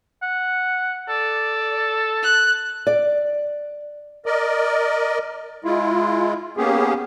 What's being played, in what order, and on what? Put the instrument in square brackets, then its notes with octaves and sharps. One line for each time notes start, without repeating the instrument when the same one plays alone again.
[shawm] F#5
[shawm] A4 [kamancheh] D5
[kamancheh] F#6
[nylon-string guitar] D5
[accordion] A#4 D5 D#5
G#3 E4 F4
A#3 B3 C#4 G4 G#4